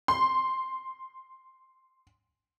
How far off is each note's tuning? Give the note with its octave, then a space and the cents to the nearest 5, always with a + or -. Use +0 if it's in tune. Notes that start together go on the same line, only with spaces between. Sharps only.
C6 +0